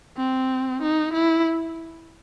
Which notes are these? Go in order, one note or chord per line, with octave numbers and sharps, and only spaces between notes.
C4
D#4
E4